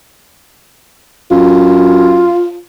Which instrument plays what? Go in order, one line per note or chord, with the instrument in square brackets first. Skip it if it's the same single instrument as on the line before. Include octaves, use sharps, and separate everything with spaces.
[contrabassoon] F#2 [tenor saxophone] F4